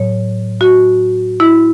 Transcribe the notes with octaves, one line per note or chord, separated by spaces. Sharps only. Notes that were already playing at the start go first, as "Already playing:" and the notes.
Already playing: A2 F#3 C#5
F#4
E4